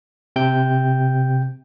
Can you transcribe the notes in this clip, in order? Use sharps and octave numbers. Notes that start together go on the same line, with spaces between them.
C3 G5 G6